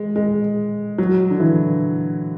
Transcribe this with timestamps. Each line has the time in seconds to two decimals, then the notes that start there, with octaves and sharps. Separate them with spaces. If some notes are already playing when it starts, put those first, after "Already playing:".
Already playing: G#3
0.16 G#3
0.98 F#3
1.30 D3
1.40 E3